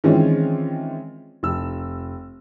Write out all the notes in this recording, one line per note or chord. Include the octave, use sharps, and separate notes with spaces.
D#3 E3 G#3 C4 C#4 F4
F1 E6